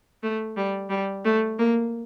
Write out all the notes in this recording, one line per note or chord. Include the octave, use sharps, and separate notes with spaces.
A3
G3
G3
A3
A#3